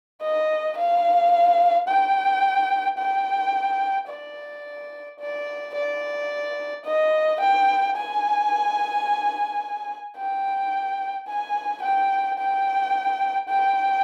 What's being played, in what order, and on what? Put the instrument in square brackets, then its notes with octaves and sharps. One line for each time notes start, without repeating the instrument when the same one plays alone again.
[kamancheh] D#5
F5
G5
G5
D5
D5
D5
D#5
G5
G#5
G5
G#5
G5
G5
G5